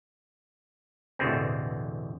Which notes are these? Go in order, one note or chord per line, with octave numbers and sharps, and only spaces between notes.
A1 E2 B2 D3 C4